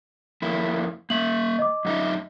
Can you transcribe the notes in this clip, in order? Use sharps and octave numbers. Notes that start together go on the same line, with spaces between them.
F2 A#3 E4
A#3 E5 F#7
D#5 D6
F#2 D#4 E5